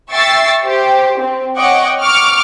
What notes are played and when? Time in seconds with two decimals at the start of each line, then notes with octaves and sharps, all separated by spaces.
0.12 E5 G5 C#6 E6 A6 C7
0.62 G4 C5
1.21 C4
1.58 C#5 D#5 F#5 G5 C#6 D6
2.02 C#6 D6 F6